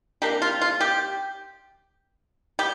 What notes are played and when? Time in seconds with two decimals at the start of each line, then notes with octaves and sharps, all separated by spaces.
0.22 C3 F3 A#3 D4 G4
0.42 F4
0.61 F4
0.81 G4
2.59 G3 G4